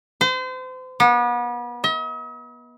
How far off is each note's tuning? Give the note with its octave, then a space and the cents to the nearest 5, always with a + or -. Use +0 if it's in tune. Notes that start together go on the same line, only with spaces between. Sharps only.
C5 -35
B3 -35
D#5 +45